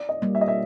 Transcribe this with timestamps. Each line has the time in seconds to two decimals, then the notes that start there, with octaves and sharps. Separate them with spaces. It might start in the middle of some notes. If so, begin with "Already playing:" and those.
Already playing: D5
0.09 D#5
0.22 G3 A#3
0.35 E5
0.41 D#5
0.48 E5